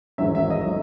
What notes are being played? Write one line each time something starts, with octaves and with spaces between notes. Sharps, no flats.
A1 G#2 D#3 F#3 C#4 E5
E5
D#5
D#3 F#3 A3